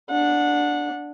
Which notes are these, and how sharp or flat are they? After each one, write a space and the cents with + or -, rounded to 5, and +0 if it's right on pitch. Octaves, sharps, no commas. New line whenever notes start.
D4 +0 F#5 -20